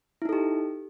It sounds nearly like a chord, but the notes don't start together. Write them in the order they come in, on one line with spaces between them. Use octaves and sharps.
E4 D#4 A4 G4